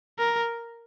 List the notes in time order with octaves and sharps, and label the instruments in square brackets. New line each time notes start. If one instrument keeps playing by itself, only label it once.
[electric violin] A#4